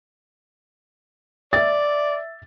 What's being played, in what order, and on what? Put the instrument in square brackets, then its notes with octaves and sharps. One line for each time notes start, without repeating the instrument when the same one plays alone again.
[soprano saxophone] D5 [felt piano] E5 A6